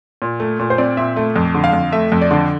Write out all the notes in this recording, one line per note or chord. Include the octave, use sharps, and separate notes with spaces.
A#2
A3
A#2
C5
C4 D5
A#2 E5
A3 E5
F2
D3
F5
F2
A3 E5
F2
D5
D3